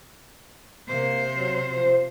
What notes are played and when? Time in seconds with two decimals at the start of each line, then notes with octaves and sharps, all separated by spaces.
0.88 C3 A#3 C5
1.33 F#3
1.68 F3